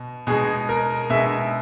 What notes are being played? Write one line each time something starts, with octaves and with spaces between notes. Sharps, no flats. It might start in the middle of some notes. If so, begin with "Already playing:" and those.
Already playing: B2
B2 G#3 G#4
A#4
B2 G#3 E5